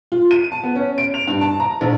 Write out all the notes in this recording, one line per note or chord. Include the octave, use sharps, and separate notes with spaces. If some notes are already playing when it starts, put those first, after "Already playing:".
F4
D#7
A5
B3
C#4
D7
F7
G2
A5
A#5
A#1